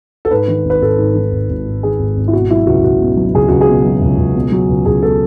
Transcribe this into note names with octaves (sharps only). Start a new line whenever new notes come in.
A4
G#2 B4
D#3
G#1
B4
G#1 A4
G#2
D#3
G#1
G#1
G#2
D#3 G#4
G#1
G#1
E4
B2 F#4
F#3 E4
C#2 F#4
C#2 F#4
B2
F#3
C#2 G#4
C#2 F#4
G#4
B2
F#3
C#2
C#2
B2
F#3
C#2
C#2 G#4
B2 A4